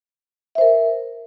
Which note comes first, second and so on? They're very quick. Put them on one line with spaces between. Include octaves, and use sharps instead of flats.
E5 C5 A#4